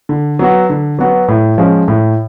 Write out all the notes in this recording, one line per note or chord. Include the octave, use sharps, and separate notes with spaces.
D3
F#3 B3 F#4
D3
F#3 B3 F#4
A2
F3 G#3 C#4
A2